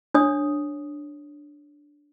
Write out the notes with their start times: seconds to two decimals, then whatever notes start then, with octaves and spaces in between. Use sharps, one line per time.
0.14 D4 C#5 D#6